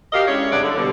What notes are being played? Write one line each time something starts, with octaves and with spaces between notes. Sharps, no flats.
F#4 G4 A#4 D#5 F5
G#3 C#4 D4 E4 C#5
G2 C3 C#4 D4 D5 F#5
D3
B2 D3 G3